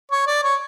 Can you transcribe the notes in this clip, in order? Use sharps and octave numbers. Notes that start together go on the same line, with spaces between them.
C#5
D5
C#5